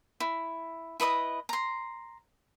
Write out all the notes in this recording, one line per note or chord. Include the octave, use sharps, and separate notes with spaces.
E4
E4 B4 D#5 D#6
A#5 C6